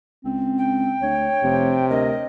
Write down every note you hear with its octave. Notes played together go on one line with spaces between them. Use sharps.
C#2 C4
G5
D2 C#5
F1 C3
D2 A#4 D#5